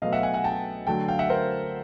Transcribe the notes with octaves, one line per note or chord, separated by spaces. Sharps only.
B2 F#3 A3 D#5 F5
E5 F#5
F#5 G#5
F#5 G#5
G5 A5
D3 F#3 A3 G5 A5
F5 G5
E5 F#5
A#4 C5